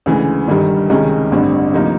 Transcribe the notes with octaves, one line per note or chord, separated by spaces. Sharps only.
D2 C#3 E3 G#3
G1 G2 D#3 G3
C#2 C3 D#3 G#3 C#4
A1 G2 D3 G3 C4
D2 C3 F3 A#3 D#4